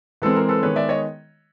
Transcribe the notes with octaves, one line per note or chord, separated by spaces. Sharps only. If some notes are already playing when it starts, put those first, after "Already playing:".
E3 G#3 C4 A4 B4
A#4
A4 B4
D#3 G#3 B3 B4 C#5
D5 E5
C#5 D#5